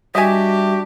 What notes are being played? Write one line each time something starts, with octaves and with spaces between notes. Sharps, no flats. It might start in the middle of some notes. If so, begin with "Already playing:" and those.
G3 D4 F#4 G4 D#5 E5 G#5